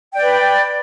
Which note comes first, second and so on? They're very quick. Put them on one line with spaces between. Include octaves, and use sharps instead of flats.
G5 D5 B4